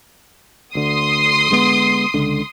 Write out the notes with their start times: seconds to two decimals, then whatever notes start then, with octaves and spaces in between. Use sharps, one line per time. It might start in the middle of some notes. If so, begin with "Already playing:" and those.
0.75 D2 D3 C6 D#6
1.50 D3 G#3 B3
2.14 C#2 D3